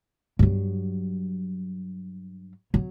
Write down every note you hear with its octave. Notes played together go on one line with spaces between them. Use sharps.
G2 F#3
F#3